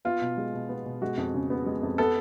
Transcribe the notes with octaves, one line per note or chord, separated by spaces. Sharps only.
B3 F4
B2
G#3
B2
B3
B2
G#3 F#4
F2
C#3
B3
G#3
F2
B3 A4